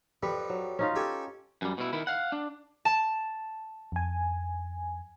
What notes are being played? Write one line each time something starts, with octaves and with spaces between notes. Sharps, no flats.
F2 G3 B4
F#3
C#4 D#4 F4
G4 A4 G#5
F#2 G3
B2 E4
D#3 E4
F5 F#5
D4
A5
F2 G#5